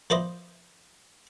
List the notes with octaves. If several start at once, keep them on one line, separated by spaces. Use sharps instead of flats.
F3 B4 C5 D5 D#5